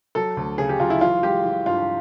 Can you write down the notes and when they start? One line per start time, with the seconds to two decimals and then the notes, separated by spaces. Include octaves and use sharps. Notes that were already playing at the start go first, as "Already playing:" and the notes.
0.15 F#3 A4
0.37 D2
0.58 C#3 G#4
0.69 G4
0.80 F#3 F4
0.90 E4
1.01 E3 F4
1.23 G#3 G4
1.45 E3
1.66 G2 F4